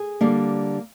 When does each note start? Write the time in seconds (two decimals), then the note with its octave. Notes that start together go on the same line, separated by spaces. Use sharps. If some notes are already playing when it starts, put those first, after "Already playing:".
Already playing: G#4
0.21 D3 G3 A#3